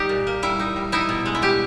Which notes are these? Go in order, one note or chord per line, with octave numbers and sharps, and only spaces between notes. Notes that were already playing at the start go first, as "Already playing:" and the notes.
Already playing: G3 D#4 G4
A#2
A#3
G3 E4
D#4
G3
D#4 E4
B2
G#3
E4
G3 G4